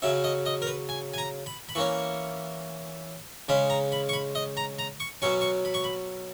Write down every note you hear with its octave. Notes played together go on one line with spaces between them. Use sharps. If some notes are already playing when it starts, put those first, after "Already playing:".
C#3 F#3 C#4 E5
D#5
D#5
A#4
B4
G#5
G#5
A#5
B5
B5
E3 A#3 C#4 C#6
C#3 G#3 C#4 B5
A#5
B5
C#6
B5
D#5
A#5
A#5
C#6
B2 F#3 C#4 C#6
C#6
B5
C#6
B5